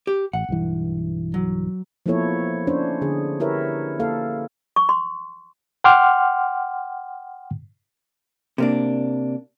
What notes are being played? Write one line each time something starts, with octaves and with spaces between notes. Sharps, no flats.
G4
A1 F#5
B1 G2 E3
F#3
F3 A#3 B3 E4 A4 C#5
C#4 D4 C5 C#5
D3 G#4
E4 G4 A#4 B4 C#5 E5
A#3 A4 F5
C#6
C6
F#5 G5 C6 D6 F6
C3 A#3 D4